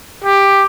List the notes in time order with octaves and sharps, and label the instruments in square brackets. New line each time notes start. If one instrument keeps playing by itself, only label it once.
[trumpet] G4